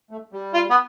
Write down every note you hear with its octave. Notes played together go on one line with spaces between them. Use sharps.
A3
G3
F4
B3